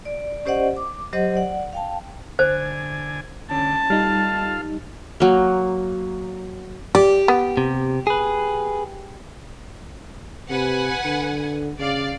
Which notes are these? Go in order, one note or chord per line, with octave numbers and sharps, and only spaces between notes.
D5
C#4 G4 C5 D5 D#5 F#5
D6
F#3 G4 C5 D#5 F#5
D5 F#5
F5 G5 A5
D3 C5 G#5
D3 C#4 A5
G3 D#4 F4 A4 F5
F#3 A#3
G4 D5
B3
C3
G#4 B4
C3 B4 F#5 G#5
D3
C#3 D5 F5